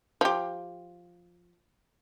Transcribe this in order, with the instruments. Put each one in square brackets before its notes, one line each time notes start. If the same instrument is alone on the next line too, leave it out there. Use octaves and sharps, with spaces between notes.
[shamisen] F3 G4